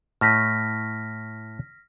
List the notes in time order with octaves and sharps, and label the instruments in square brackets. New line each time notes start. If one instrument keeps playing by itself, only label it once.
[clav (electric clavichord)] A2 A3 D#5 [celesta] F6 A#6 B6